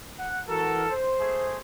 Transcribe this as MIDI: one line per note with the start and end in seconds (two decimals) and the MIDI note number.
0.19 0.41 78
0.48 0.86 52
0.48 0.86 66
0.48 0.93 69
0.48 0.86 70
0.90 1.58 72
1.20 1.59 57
1.20 1.59 68